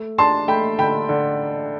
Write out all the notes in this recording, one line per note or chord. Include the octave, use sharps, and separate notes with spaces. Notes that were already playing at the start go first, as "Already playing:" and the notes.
Already playing: A3
D4 A5 C6
A3 G5 B5
D3 G5 B5
D3